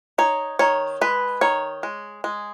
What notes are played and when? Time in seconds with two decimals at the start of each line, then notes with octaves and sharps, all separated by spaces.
0.18 D#4 C#5
0.59 D#3 C#5
1.01 G#3 B4
1.41 D#3 C#5
1.83 G#3
2.24 G#3